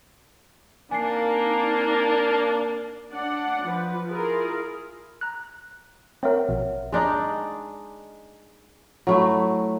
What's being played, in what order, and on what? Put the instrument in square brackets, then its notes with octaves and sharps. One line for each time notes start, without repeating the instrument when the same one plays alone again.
[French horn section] A#3 [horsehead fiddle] C4 D#4 [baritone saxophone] D4 [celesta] G#5 C7
[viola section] D4 D5 F#5
F3 B4
E4 F4 G#4 A#4
[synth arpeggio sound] A#5 F#6
[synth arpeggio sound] C4 A#4 [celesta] C#5 E5 F#5
[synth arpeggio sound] A#1 B2
[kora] G#3 D4 D#4
F#3 A3 E4